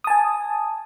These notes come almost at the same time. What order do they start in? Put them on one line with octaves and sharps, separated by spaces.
D#6 A5 G#5